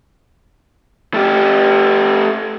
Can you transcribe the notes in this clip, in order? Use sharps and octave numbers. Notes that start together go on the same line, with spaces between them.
A3 G4